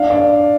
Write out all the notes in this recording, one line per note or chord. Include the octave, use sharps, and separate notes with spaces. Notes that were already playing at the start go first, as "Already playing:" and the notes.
Already playing: D4 F5
D5